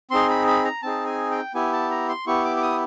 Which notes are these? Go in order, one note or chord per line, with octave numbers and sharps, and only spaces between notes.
C4 D#4 G#4 C6
B5
B5
A#5
C4 D#4 G#4 A5
G#5
G5
B3 E4 G4 G#5
A5
A#5
C6
B3 E4 G4 C#6
D6
D6
D#6